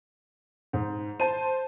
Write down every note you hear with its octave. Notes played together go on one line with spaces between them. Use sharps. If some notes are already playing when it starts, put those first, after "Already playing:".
G#2
C5 A5 D#7